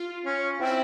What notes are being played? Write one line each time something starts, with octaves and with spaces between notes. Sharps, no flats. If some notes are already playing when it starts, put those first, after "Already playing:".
Already playing: F4
C#4
C4 E4